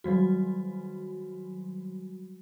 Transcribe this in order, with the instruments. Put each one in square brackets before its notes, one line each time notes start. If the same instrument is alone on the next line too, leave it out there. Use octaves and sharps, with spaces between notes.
[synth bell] D#3 F#3 G3 F#4